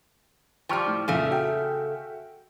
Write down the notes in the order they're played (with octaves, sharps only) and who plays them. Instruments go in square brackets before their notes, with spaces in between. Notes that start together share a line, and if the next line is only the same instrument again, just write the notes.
[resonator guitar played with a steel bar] F3 G3 [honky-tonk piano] G5 C#6 F6
[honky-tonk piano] A2
[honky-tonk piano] F2 A#2 E5 [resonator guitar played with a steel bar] C#3 A3
[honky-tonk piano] F#4 E5 G5